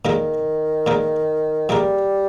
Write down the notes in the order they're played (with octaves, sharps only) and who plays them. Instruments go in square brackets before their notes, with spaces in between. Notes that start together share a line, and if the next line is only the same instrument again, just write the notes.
[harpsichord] A#2 G#3 D#4 A#4 [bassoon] D#3
[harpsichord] A#2 G#3 D#4 A#4
[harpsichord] A#2 G#3 D#4 A#4 [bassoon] G3